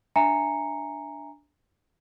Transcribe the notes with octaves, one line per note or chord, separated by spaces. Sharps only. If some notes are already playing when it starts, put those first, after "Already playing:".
D4 E5 G#5 A#5 C#7